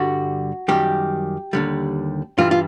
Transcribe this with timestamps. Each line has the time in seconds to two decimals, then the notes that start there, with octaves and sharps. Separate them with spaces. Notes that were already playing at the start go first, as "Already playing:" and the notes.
Already playing: G2 D3 G3 F#4
0.68 F#2 D#3 G3 G4
1.53 D#2 D3 G3
2.38 G2 E3 G3 F4
2.51 F4